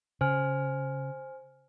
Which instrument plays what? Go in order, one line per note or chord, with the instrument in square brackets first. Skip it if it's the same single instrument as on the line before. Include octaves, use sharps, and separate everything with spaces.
[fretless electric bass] C#3 [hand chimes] C5 G#5 F6